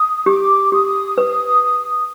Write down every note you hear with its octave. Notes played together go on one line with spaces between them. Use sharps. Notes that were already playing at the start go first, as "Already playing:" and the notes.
Already playing: D#6
G4 D6
G4 D#6
B4